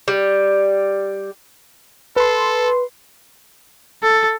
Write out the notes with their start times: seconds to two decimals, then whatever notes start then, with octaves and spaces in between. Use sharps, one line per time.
0.08 G3
2.16 A4 B4 C6
4.03 A4